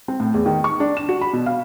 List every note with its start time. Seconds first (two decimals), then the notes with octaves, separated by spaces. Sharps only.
0.08 C4
0.20 A2
0.34 E2
0.46 D#3
0.64 C#6
0.80 D4
0.97 E7
1.09 F#4
1.21 B5
1.33 B2
1.46 F5